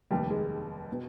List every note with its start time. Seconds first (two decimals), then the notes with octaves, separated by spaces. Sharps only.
0.11 F1 D#2 D#3 G3
0.30 G#3
0.92 B2